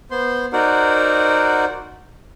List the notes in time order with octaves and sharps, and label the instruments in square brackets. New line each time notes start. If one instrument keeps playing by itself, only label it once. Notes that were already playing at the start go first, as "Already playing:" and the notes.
[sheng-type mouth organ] B3 C5 C6
D#4 F#4 A#4 C5 D5 F#5